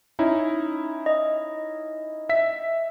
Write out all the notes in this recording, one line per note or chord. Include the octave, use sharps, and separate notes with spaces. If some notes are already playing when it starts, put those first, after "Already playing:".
C#4 D#4 E4
D#5
E5 B6